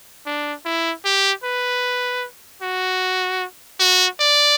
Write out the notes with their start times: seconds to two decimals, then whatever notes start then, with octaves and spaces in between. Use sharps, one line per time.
0.26 D4
0.65 E4
1.05 G4
1.44 B4
2.62 F#4
3.80 F#4
4.20 D5